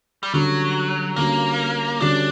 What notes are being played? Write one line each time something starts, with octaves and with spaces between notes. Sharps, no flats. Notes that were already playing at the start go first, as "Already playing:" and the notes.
G3
D3 F#3 G3 C#4 F#4
D3 G3 A#3 C#4 F#4
D3 G3 C#4 D4 F#4